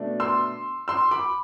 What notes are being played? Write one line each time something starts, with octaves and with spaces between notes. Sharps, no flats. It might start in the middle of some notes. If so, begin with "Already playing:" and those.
Already playing: B2 A3 D4
C6 E6
C6 E6
B5 D6